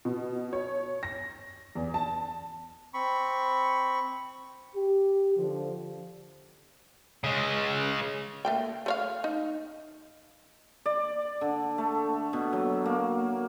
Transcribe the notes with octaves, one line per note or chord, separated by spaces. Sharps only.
B2
C#5
A#6
E2
A5
C4 B5 C#6
G4
D3 F3
C#3 G#3
A3 A#3 G5
A3 C#5 F5
D#4
D5
D3
A3
B2
F#3
A#3